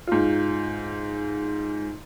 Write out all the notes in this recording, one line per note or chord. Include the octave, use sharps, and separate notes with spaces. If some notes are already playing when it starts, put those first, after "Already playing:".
G#2 F4